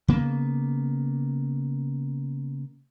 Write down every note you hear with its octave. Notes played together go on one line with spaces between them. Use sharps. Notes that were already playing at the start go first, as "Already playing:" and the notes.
C#3 A#3 B3